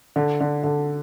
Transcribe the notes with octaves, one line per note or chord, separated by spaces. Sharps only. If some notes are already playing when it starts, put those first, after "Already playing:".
D3
D3
D3